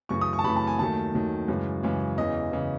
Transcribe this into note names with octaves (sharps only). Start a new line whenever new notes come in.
F#2 C#3 E3 A3 C#6
D#6
C#6
A5
F#2 C#3 E3 A3 B5
A5
G#5
D#2 D#3 F#3 A3 A5
D#2 D#3 F#3 A3
F#2 C#3 E3 G#3
F#2 C#3 E3 G#3
E2 C#3 E3 D#5
C#3 E3